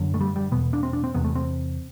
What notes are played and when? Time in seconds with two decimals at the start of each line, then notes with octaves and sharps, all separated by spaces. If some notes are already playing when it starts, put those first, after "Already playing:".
Already playing: F#2 D3
0.14 A3
0.21 G3
0.36 G3
0.52 E2 B2 B3
0.73 D4
0.83 C4
0.93 D4
1.04 C4
1.15 E2 C3 B3
1.24 A3
1.36 C4